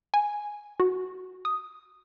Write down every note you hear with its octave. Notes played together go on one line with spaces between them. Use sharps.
G#5
F#4
D#6